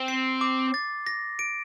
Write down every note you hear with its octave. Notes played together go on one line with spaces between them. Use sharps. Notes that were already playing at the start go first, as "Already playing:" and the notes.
Already playing: C4
C7
D6
A6
A#6
D7